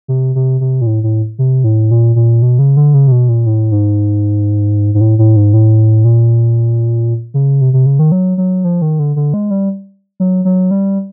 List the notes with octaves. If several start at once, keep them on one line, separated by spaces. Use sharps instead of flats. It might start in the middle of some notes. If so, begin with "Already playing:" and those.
C3
C3
C3
A#2
A2
A2
C3
A2
A#2
A#2
B2
C#3
D3
C#3
C3
B2
A#2
A2
G#2
G#2
A2
A2
G#2
A2
A#2
C#3
C3
C3
C#3
D#3
F#3
F#3
F3
D#3
D3
D3
G#3
G3
F#3
F#3
G3